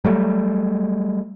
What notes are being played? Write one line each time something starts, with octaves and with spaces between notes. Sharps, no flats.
F#3 G3 A3